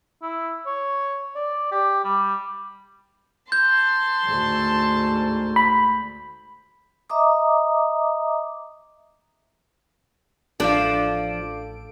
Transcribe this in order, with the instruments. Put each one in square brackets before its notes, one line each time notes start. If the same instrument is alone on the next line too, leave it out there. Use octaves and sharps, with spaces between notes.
[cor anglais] E4
C#5
D5
G4
G3
[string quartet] A5 C6 [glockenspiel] G6
[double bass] D2 G#2
[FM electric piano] B5
[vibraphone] D#5 E5 A#5 D6 D#6
[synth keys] A1 A4 D7 [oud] F3 D4 [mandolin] F4 D5 F5